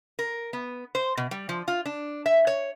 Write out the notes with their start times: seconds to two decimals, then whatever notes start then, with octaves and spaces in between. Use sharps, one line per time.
0.19 A#4
0.53 B3
0.95 C5
1.17 B2
1.31 G3
1.49 F3
1.68 F4
1.86 D4
2.26 E5
2.47 C#5